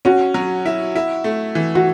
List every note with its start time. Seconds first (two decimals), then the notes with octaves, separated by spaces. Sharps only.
0.05 C#4 F#4
0.34 F#3
0.66 E4
0.95 E4
1.24 A3
1.55 E3
1.75 F#4